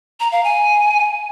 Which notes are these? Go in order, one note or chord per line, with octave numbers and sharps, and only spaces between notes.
A#5
F5
G#5